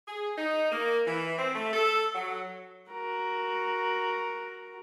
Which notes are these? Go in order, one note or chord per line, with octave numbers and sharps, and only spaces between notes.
G#4
D#4
A#3
E3
C4
A3
A4
F#3
F#4 A#4